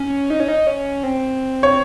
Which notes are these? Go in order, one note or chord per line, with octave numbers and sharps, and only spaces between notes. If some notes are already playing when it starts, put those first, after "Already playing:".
Already playing: C#4
D#4
C#4
D#4
C#4
C4
C#5